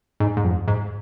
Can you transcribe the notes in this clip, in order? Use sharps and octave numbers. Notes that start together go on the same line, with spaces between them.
G#2
G#2
F2
G#2